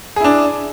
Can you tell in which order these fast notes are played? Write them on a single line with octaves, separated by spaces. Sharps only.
G#4 E4 D4